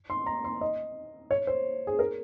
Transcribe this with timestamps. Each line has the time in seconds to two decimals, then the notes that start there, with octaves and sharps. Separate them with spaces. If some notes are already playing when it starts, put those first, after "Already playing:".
0.10 C6
0.26 A#5
0.44 C6
0.61 D#5
1.31 C#5
1.47 C5
1.87 G#4
1.99 A#4